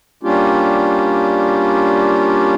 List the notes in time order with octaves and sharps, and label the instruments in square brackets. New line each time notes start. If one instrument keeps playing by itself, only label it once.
[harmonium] G3 A#3 C#4 D4 F4 G4